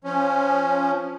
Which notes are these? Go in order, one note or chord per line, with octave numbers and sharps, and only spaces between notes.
F3 C#4